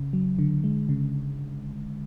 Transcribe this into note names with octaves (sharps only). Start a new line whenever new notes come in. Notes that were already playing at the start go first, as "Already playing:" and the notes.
Already playing: C#3
F#3
D3
G#3
C#3